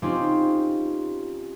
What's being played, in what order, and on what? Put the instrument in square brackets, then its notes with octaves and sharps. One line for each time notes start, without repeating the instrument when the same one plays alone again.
[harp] C4 C#4 D#4 F4 G4